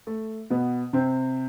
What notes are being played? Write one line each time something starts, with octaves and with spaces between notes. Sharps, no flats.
A3
B2 B3
C3 C4